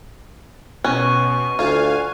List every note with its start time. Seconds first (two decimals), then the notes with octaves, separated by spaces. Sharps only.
0.84 B2 C#4 C#6 F#6
1.59 D2 F4 F5 G#5